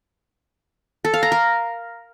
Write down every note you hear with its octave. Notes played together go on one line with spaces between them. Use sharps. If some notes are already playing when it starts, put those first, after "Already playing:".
A4
F5
A#5
A#4